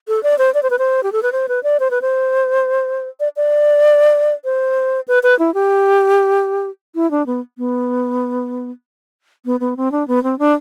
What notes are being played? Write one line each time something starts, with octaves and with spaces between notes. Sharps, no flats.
A4
D5
C5
D5
C5
B4
C5
G4
A4
B4
C5
B4
D5
C5
B4
C5
D5
D5
C5
B4
B4
E4
G4
E4
D4
B3
B3
B3
B3
C4
D4
B3
C4
D4